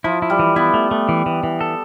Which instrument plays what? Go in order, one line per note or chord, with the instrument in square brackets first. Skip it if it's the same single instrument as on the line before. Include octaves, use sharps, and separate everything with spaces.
[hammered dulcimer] F3 [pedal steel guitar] E4
[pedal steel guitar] E4
[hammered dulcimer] G3
[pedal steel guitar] E3
[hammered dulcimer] B3 [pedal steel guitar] E4
[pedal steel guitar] A3
A3
E3
E3
E3
A4